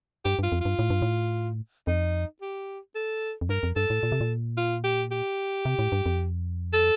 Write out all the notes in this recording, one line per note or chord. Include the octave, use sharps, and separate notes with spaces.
G2 G4
G2 F4
F2
G2 F4
A2
G2
A2
F2 D#4
G4
A4
F2
G2 A#4
F2
G2 A4
A2
A#2
C3
A#2
F4
G4
G4
C3
A2
G2
F2
A4